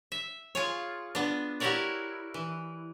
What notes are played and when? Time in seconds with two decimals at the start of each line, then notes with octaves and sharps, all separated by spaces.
0.12 E5
0.55 F4 G#4 C#5
1.15 B3 D4
1.60 E4 F#4 G4 A#4 C#5 D5
2.34 E3